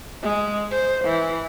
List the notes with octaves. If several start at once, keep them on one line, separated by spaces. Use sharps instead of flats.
G#3
C5
E3